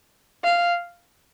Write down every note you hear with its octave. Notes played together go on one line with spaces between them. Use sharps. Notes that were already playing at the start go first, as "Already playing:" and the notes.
F5